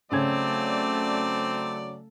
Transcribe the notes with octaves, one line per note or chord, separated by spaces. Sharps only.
C#3 F#3 A3 C4 C#4 D5 G#6